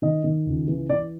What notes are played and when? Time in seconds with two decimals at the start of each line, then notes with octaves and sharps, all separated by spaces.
0.02 D#3 D#5
0.24 D#3
0.46 C#2
0.68 E3
0.89 E3 D5